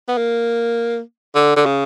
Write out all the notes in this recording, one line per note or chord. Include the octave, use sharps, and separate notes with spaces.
B3
A#3
D3
D3
C#3